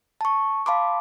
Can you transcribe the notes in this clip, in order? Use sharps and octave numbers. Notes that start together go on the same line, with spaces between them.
A5 C#6
F5 A5 B5 C6 D6